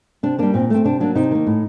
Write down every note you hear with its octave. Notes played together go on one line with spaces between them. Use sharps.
C3 D4
G3 A#3 D4
A#2 C4
A3 C4
C3 D4
F#3 A#3 D4
C3 D#4
D#3 G3 A#3
A2